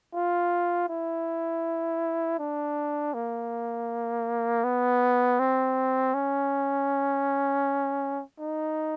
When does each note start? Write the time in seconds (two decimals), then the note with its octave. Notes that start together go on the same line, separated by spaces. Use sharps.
0.14 F4
0.89 E4
2.39 D4
3.14 A#3
4.64 B3
5.39 C4
6.14 C#4
8.39 D#4